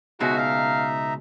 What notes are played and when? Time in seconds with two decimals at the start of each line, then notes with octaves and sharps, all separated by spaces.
0.20 C#2 B2 G#3 D#4 F#4 E5 A#5
0.37 F5